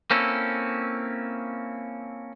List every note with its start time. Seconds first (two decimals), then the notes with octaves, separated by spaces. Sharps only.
0.11 A#3 C4 C#4 E4 A4